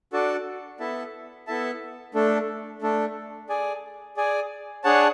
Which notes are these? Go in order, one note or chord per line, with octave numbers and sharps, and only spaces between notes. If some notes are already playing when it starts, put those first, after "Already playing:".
D4 F#4 A4 D5 A5
B3 E4 A4 E5 A5
B3 E4 A4 E5 A5
A3 D4 A4
A3 D4 A4
G#4 D5 G#5
G#4 D5 G#5
D4 G#4 C#5 F#5 A5